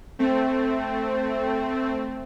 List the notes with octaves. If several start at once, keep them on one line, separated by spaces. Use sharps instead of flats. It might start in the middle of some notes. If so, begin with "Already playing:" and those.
A3 C4